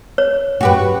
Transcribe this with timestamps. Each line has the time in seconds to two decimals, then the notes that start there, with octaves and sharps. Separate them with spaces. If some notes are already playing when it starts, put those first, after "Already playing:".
0.18 C#5
0.61 F#2 F#4 G4 B4